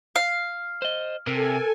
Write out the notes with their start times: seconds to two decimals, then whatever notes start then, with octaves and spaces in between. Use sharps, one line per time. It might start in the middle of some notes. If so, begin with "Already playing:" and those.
0.16 F5
0.82 C5 D#5
1.27 C3 A4 A#4 G#5